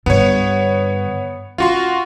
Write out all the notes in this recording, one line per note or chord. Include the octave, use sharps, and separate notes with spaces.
G2 D3 B3 C#5
C#4 F4 F#4 C6